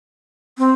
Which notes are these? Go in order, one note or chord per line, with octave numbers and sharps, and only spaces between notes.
C4